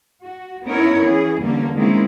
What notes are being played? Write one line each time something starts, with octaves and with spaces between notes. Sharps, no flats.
F#4
B3 C#4 D#4 E4 A#4 C#5
E3 B3 C#4 G#4
E2 D3 G3 A#3 C#4
D#3 G#3 A#3 C4 C#4 E4